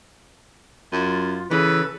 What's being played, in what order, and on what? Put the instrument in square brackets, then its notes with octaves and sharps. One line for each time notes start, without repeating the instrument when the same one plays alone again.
[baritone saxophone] F#2 [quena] F4
[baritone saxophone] C#3 [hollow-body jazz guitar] E3 [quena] A4 [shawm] B4